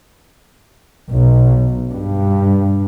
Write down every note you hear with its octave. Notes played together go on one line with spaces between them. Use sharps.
B1
G2